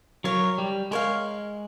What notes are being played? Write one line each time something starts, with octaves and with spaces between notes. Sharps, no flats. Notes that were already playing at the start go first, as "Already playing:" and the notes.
F#3 A#4 C#5 F5
G3
G#3 A#4 C#5 F5